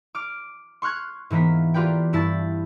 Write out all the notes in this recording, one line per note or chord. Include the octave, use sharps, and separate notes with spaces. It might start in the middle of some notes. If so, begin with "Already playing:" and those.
D6 F6 D7
C6 C#6 F6 F#6 G#6
G#2 E3 A#3 B3 B6
A#3 F4 G4 B4 D5 G5
G2 E4 A5 A6